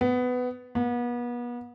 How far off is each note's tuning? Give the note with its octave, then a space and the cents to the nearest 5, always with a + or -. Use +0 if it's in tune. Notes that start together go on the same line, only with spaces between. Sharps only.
B3 +15
B3 -35